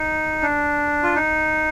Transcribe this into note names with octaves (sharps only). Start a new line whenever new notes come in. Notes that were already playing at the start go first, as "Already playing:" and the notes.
Already playing: D#4
D4
F4
D#4